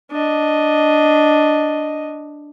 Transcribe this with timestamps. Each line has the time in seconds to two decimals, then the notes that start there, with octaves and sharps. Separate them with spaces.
0.12 D4 D#5